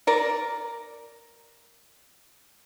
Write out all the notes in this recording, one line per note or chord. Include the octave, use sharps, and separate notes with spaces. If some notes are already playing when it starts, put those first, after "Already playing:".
A#4 D5